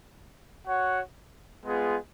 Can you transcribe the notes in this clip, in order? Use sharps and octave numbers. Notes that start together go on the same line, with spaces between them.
F#4 C#5 F#5
G#3 B3 F4 G#4